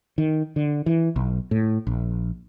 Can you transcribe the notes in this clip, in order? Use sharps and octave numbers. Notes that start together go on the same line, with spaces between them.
D#3
D3
E3
B1
A2
A#1